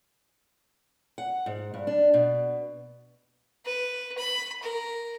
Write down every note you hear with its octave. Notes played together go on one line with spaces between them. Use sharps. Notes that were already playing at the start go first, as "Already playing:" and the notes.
F#5
G#2
G2
D4
B2
B4
B5
A#4